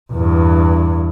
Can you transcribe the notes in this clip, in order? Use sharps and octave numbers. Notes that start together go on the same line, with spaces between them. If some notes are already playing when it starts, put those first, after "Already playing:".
E2 G2